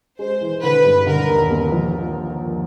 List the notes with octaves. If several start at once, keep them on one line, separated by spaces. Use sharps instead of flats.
G#3 C5
E3
D3 B4
G2
D3 A#4
D#2
A#3
F3